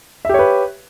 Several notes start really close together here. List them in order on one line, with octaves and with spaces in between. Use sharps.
E5 G4 C#5 B4